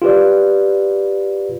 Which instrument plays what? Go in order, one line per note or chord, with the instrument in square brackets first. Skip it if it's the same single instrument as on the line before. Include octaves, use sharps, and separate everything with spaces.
[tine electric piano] F4 G4 B4 D5